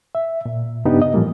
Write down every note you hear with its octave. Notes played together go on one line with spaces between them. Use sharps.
E5
A#2
G2 C#3 B3 D4 D#4 G4
D#5
A2 E3 F3 G3 A#3